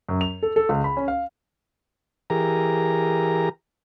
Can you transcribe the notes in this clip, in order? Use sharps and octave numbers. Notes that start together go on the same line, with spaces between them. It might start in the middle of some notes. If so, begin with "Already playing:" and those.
F#2
F7
A4
A4
C#2
B5
C#4
F5
E3 G4 G#4 A#4 A#5